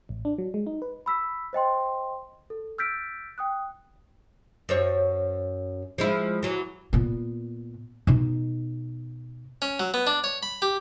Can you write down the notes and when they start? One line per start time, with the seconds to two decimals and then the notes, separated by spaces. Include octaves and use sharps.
0.09 A1
0.25 D4
0.38 F#3
0.54 G#3
0.67 D#4
0.82 B4
1.06 B5 E6 B6
1.53 C5 D#5 G5 C6
2.50 A4
2.78 E6 F6 G6 A6 B6 D7
3.38 G5 D#6 F#6
4.69 F#2 C5 C#5
5.98 F3 G#3 E4
6.43 E3 F#3
6.93 A#2 B3
8.07 B2 D#4
9.62 C#4
9.80 F#3
9.94 B3
10.07 D4
10.24 C#5
10.43 B5
10.62 G4